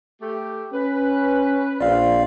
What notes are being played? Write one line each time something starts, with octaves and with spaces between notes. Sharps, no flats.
A3 G4
C#4 B4
A#1 C4 F4 D5 F5